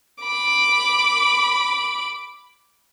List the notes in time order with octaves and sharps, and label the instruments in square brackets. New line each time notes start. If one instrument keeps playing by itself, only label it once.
[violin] B5 D6